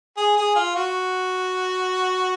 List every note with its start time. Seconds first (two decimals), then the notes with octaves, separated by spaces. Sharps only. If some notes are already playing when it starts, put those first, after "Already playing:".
0.17 G#4
0.37 G#4
0.56 F4
0.75 F#4